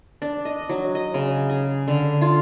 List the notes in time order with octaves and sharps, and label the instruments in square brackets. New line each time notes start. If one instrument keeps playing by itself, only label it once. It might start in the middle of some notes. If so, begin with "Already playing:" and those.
[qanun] D4
D#5
F#3
D#5
C#3
G#4
D3
F4